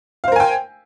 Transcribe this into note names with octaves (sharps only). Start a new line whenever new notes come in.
A#4 C5 F5 G5 G#5